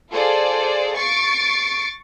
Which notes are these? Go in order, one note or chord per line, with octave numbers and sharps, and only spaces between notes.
F4 G#4 A4 C5 D5
C#6 A6 C7 D7